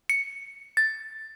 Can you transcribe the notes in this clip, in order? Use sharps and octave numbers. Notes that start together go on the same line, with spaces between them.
C#7
A6